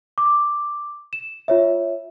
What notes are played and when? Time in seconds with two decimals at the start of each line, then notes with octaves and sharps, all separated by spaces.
0.18 D6
1.13 E7
1.48 F4 C#5 E5